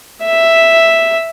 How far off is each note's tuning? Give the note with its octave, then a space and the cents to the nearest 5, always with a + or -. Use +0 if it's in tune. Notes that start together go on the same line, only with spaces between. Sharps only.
E5 +0